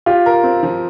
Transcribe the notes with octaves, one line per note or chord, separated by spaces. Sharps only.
F4 G4
A#4
C4
F3